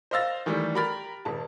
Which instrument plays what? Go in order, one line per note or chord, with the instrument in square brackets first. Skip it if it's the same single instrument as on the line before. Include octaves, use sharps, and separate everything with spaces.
[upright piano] C5 D#5 F5 E6 A6 A#6
D#3 E3 G3 A3
G4 A#4 A#5 B5 F6 A6
D#1 A5